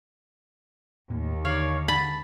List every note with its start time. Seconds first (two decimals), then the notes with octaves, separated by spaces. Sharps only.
1.10 D#2 A2 A#3
1.45 D3 C#5 D5 F5
1.88 A5 B5